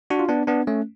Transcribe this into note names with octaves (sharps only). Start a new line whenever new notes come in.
D4 F#4
F4
B3 D4
B3 D4
A3 C#4